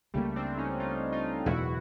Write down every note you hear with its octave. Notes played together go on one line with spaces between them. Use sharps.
C#2 C#3 F3 G3 A3 A#3
C4 D4
C#4 D#4
D#4 F4
D#4 F4
F#1 E2 B2 G#3 E4 F#4